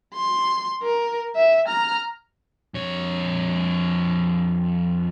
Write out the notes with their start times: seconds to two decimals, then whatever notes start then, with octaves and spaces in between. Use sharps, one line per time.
0.14 C6
0.83 A#4
1.36 E5
1.68 A#5 F6
2.74 F2 C#5